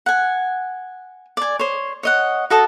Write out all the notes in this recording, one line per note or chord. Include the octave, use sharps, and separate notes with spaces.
F#5 G#5
D5 G#5
C5 C#5
C#5 D#5 F#5
F#4 A4 D#5 A5